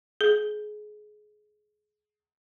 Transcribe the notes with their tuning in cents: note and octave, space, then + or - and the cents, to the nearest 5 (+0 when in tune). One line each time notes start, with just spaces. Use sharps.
G#4 +25